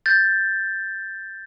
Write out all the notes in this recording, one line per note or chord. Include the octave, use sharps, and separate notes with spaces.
G6 A6